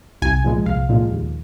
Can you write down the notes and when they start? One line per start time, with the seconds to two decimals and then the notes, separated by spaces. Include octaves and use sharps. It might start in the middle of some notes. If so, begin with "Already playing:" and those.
0.22 C2 G#5
0.44 A#2 F3 G#3
0.66 C2 F5
0.89 A#2 F3 G#3
1.11 D#2